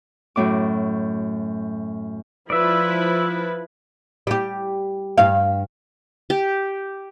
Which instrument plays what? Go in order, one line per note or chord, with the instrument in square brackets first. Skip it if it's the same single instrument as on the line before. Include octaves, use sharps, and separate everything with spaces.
[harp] F#2 A2 D6
[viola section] F3 E4 B4 [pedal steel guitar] D5 E5
[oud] G3 G4
G2 F5
[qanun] G4